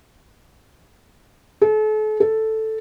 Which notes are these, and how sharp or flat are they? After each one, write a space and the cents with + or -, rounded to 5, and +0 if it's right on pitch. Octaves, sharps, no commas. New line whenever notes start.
A4 -40
A4 +0